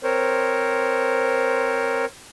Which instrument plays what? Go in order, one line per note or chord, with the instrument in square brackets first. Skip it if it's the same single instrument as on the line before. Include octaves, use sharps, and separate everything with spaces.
[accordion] C4 A#4 C5 C#5